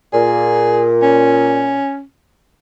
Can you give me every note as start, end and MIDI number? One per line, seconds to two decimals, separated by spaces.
0.13 1.75 46
0.13 0.87 68
1.02 2.02 61